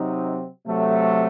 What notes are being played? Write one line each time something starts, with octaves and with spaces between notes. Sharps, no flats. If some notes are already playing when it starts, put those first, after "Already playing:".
Already playing: C3 F#3 C4 D#4
C3 F#3 A3